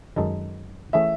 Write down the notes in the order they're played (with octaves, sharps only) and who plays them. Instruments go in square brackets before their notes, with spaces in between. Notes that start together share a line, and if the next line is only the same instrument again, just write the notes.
[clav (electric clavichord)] F#2 D#3 G#3 D#4 A4
[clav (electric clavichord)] E3 A3 C#4 G#4 [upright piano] E5